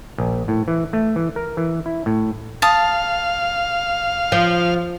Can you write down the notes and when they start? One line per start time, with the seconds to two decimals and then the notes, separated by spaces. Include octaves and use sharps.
0.18 A#1
0.48 A2
0.68 E3
0.93 A3
1.16 E3
1.36 A#4
1.57 E3
1.86 E4
2.06 A2
2.62 F5 A5 D#6
4.32 F3